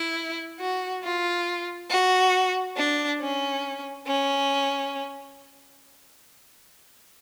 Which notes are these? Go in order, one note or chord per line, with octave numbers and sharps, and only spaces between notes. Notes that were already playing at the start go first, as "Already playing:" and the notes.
Already playing: E4
F#4
F4
F#4
D4
C#4
C#4